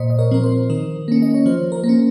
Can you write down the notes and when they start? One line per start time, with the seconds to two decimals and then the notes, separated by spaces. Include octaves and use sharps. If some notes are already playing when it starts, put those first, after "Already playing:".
Already playing: A#2 C5 D#5
0.10 D#5
0.19 A#4 C#5
0.31 F3 C4 A#4
0.43 C5
0.70 D#3 A#4
1.08 A#3 C#4
1.22 D#5
1.34 C#5
1.46 F3 C5
1.72 A#4
1.84 A#3
1.89 C#4